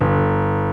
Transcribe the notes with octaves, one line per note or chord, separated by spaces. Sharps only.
G1